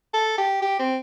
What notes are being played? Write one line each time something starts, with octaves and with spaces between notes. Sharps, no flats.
A4
G4
G4
C4